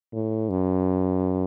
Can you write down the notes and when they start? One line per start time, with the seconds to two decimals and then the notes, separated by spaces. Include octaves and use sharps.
0.13 A2
0.50 F#2